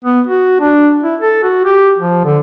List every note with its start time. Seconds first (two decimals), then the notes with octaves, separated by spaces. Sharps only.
0.04 B3
0.27 F#4
0.61 D4
1.03 E4
1.21 A4
1.43 F#4
1.65 G4
1.98 F3
2.25 D3